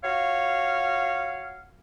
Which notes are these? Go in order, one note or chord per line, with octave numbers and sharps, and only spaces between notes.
F4 F#4 C#5 F5